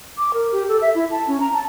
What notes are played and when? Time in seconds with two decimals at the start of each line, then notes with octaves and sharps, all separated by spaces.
0.18 D6
0.34 A#4
0.52 G4
0.69 A4
0.82 E5
0.95 E4
1.11 A5
1.27 C#4
1.40 A#5
1.54 A5